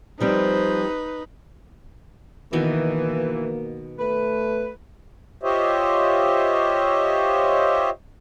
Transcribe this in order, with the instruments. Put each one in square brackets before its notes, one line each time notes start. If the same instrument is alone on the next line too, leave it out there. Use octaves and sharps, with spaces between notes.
[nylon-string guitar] F3 G3 C4 [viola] D#4 B4 [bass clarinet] C5
[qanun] B2 D#3 B3 [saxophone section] E3 [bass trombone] A#3
[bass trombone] A3 [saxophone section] B4
[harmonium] F4 G4 C5 C#5 D#5 E5